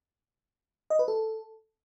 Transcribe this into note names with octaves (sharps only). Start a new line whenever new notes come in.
D#5
B4
A4